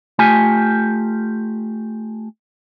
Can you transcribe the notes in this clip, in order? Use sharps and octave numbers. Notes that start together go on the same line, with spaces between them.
A3 F4 G4 G#5